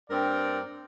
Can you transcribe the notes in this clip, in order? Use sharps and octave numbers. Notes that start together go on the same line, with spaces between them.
G2 A#3 C4 A#4 D5 G5